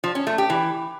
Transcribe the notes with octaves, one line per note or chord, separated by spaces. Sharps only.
F3
C#4
A3
G4
E3